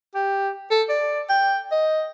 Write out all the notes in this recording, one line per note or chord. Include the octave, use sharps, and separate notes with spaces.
G4
A4
D5
G5
D#5